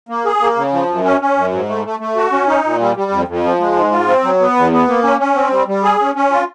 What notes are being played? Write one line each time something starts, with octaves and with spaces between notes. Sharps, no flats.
A#3
G#4
A#3
C#3
F3
F#2
C#4
C#4
F#2
G#2
A3
A3
A3
F#4
C#4
D#4
A#2
G3
G3
F2
F2
F3
G#3
G#2
F4
C4
F#3
B3
E2
B3
A#3
C#4
C#4
C4
G3
G3
G#4
C#4
C#4
F4